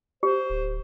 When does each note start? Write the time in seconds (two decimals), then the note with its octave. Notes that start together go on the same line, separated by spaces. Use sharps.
0.23 G4 C5
0.50 D1